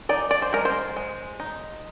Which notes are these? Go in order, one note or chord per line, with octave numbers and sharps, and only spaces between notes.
D#4 D5
D5
C5
G#3 A#4
C5
G#3
D#4